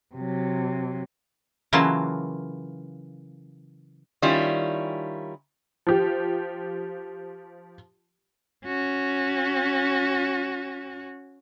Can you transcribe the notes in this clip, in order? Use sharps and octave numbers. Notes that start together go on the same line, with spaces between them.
C3 F#3
C#3 E3 F#3 A#3 F4 A5
D#3 G3 C#4 E4 F4
F3 G4
C#4 F#4